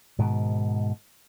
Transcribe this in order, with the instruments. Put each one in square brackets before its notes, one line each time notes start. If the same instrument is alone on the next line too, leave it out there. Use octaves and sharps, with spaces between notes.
[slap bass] G#2 B2 D#3